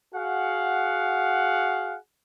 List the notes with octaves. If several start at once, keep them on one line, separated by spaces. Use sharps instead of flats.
F#4 G#4 F5 F#5